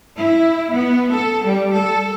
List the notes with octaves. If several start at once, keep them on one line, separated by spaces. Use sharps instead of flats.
E4
B3
A4
G3
A4